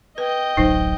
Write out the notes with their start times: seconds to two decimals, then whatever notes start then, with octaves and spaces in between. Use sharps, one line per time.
0.18 B4 D#5 G5
0.57 D1 A1 F#3 D#4 C5